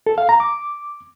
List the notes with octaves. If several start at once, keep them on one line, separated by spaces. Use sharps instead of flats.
A4
F5
A#5
D6